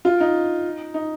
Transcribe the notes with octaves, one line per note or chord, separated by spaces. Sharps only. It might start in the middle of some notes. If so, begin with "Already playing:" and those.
F4
D#4
D#4